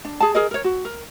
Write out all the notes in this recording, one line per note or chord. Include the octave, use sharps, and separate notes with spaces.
D4
G#4 A5
G#4 A#4 D#5
A#4 C#5
F#4
A#4